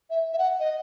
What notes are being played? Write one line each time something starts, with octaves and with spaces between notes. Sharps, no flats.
E5
E5
F#5
D#5